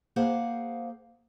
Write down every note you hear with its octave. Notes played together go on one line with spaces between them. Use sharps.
A#3 G#4 C5 F5 F#5